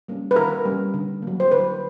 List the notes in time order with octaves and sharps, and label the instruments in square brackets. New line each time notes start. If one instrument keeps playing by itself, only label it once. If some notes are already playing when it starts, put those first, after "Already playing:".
[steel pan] G3 A#3 C#4
B4
D#3 A#4
G3 A#3 C#4
D3
F#3 A#3
C5
D3 B4